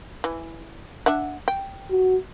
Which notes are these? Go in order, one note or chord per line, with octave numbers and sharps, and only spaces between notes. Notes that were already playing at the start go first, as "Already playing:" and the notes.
E3
D4 E5 F#5
G5
F#4